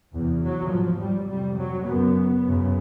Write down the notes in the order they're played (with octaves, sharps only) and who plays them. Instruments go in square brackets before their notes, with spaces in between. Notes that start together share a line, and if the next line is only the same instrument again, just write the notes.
[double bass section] E2 C3
F#3
G#2 F3
G3
F2 C3 G3
F#3
F#2 C#3 B3
F#2 C#3